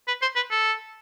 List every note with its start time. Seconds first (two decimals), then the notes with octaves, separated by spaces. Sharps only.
0.08 B4
0.22 C5
0.36 B4
0.51 A4